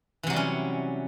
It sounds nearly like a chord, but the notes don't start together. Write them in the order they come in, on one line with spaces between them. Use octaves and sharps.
E3 C3 F#3 G3 C#4